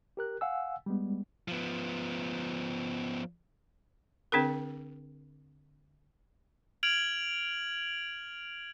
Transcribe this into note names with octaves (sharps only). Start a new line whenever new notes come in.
G4 A#4 F#6
F5 F#5 G#5 E6
G3 G#3 B3
F3 B3
D3 C4 D4 G#4 A#4
F6 G#6 D7 F7 F#7